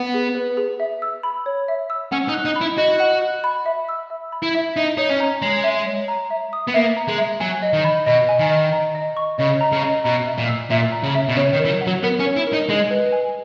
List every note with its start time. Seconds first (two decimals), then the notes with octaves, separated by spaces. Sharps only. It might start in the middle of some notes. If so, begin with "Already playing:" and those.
Already playing: B3 F#5
0.14 G#4
0.35 B4
0.57 G#4
0.80 E5
1.02 E6
1.23 B5
1.46 C#5
1.68 E5
1.90 E6
2.12 C#4 F#5
2.28 D#4
2.34 F#6
2.45 D#4
2.56 B5
2.61 E4
2.78 F#4 D#5
3.00 F#5
3.22 F#6
3.44 B5
3.66 E5
3.89 E6
4.10 E5
4.32 B5
4.42 E4
4.55 E5
4.76 D#4 E5
4.97 D#4 C#5
5.10 C#4
5.20 A#5
5.42 G#3 C#5
5.64 E5
5.86 C#5
6.08 A#5
6.31 E5
6.53 D#6
6.67 B3
6.74 A#3 E5
6.97 A#5
7.08 G#3
7.18 E5
7.40 F#3 G#5
7.62 D#5
7.73 D#3
7.84 B5
8.06 B2 D#5
8.29 G#5
8.39 D#3
8.50 D#5
8.73 A#5
8.95 D#5
9.17 C#6
9.39 C#3 D#5
9.61 A#5
9.72 C#3
9.83 D#5
10.04 B2 A#5
10.26 E5
10.38 A#2
10.48 E6
10.70 A#2 E5
10.92 A#5
11.03 C#3
11.15 E5
11.28 B2
11.36 C#3 C#5
11.53 D#3
11.59 A#4
11.65 E3
11.70 F#3
11.81 F#5
11.87 F#3
12.03 B3 A#4
12.19 C#4
12.25 C#5
12.36 E4
12.47 A#4
12.53 D#4
12.69 G#3 D#5
12.91 B4
13.12 G#5